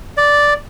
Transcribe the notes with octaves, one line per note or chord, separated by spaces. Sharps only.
D5